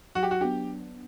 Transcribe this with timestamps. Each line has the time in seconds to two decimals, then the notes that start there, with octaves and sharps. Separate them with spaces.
0.15 F#3 F#4
0.23 G4
0.31 F#4
0.41 B3 D4 G4